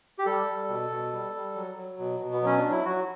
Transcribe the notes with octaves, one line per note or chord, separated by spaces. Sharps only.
G4
G3 A4
G3
B2
B2
G3
G3
F#3
F#3
B2
B2
B3
F#3 C#4
D4
F#3
E4
F#3 F#4